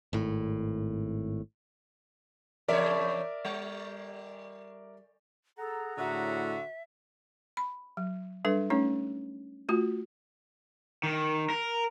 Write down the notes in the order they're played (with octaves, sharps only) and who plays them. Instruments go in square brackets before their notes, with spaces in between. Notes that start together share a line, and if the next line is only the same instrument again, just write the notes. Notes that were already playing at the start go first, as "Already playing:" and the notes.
[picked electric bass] G#1 A2
[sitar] E2 C#3 C#5 [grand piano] A#4 D5 E5
[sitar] G3
[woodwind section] G#4 F#5 A#5 [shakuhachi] A4
[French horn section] A2 [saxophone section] D3 F#4 [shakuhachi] E5
[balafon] B5
F#3
G3 D4 A4 B4
A3 C#4 D#4 C#5
A3 F4 F#4
[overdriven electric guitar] D#3
A#4